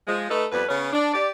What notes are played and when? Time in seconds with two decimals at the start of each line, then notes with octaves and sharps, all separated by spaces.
0.08 F3 G#3
0.30 A3 D#4 A4 B4
0.52 F2 G3 B4
0.69 C#3 B3 C#4
0.93 D4
1.14 G4 D5